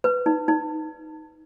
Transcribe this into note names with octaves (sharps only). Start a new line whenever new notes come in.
B4
D#4
D#4